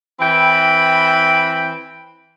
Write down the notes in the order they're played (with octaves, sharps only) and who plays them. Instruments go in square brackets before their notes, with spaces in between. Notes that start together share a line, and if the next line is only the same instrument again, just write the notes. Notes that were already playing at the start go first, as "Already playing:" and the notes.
[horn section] E3 C4 G5 B5